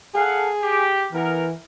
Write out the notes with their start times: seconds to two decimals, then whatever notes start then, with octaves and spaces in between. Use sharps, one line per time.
0.15 G#4 A4 F5 F#5
0.62 G4
1.12 E3 B3 A#4